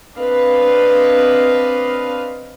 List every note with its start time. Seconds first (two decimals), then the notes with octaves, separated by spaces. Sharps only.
0.18 C4 D4 B4 D#5 F5